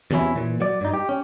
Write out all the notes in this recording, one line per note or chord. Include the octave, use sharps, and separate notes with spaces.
E2 C3 F#3 C#4 E4
A#2 E3
F#3 D5
G2 D#4
G4
C#4